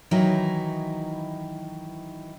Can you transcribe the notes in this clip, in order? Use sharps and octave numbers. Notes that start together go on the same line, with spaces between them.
D#3 E3 F#3 D#4 E4